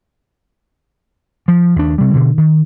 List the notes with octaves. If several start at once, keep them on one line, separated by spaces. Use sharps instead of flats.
F3
D#2 D4
C3 G3
B2 D3
D#3